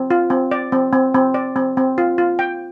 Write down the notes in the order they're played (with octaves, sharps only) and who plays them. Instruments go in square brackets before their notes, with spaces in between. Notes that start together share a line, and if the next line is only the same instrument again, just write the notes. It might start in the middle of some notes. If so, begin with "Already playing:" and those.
Already playing: [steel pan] C4
F4
C4
D5
C4
C4
C4
D5
C4
C4
F4
F4
G5